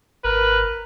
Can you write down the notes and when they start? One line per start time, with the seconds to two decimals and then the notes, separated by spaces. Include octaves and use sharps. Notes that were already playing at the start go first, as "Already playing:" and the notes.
0.25 G#1 A#4 B4